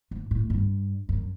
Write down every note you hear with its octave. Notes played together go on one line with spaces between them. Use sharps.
G#2
A2
G2
F#2